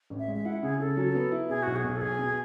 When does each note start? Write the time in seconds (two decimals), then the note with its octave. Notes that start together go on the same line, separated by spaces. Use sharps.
0.10 A1
0.19 E5
0.28 G#3
0.35 E5
0.45 E4 F#5
0.63 C#3 G#4
0.80 C#3 A4
0.97 F#3
1.15 B3
1.32 E4
1.49 B2 G#4
1.63 B1 F#4
1.76 G#4
1.84 B1
1.96 A4
2.01 B1 G#4
2.19 B2